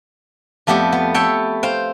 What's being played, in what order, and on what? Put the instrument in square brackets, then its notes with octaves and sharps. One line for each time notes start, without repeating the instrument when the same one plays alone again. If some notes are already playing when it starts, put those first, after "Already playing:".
[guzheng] F2 A3 B3 G4 D5
B3
A4 C#5 E5 G5
C5 F5 G5